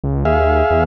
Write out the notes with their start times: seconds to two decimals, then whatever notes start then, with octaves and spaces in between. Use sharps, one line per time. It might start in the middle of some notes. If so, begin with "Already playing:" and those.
0.04 C#2
0.25 D#2 G#4 E5 F5
0.70 E2